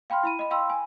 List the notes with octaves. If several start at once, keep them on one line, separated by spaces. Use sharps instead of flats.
F5 G5 B5 C6 F6
E4 B5 D#7
D#5 B5
F5 G5 B5 C6 E6
G#5